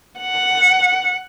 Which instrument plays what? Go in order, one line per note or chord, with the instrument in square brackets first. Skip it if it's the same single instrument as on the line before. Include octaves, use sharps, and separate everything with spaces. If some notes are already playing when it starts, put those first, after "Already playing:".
[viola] F#5